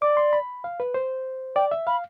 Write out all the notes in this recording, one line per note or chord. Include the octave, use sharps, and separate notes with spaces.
D5 D6
C6
B5
F5
B4
C5
D5 G5
E5
F5 B5